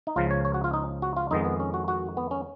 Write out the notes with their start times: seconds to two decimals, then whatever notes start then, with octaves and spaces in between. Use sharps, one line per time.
0.07 D#4
0.16 C#2 C#3 F3 F4
0.31 C#5
0.45 C#5
0.54 F#4
0.64 F4
0.73 D#4
1.02 F#4
1.16 F4
1.31 F2 D#3 G#3 B3 D#4
1.45 B3
1.60 C#4
1.74 F#4
1.88 F#4
2.17 B3
2.31 C#4